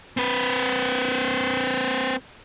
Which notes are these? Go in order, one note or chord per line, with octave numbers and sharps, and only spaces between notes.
C4 B4